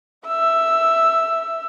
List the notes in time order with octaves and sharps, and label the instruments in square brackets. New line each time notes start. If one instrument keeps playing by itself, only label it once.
[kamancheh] E5 E6